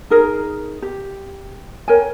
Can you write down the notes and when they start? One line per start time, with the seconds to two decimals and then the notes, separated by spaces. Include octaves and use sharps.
0.10 D#4 G#4 A#4
0.82 G4
1.88 A#4 C#5 G5 G#5